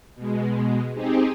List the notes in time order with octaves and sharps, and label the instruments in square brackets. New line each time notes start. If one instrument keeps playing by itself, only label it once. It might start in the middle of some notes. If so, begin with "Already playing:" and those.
[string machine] B2 G#3
C4 D#4 G4 G#4